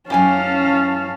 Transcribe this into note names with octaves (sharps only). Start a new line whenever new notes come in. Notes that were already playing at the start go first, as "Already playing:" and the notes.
F#2 C#4 E4 G4 C#5 F5 G#5 A5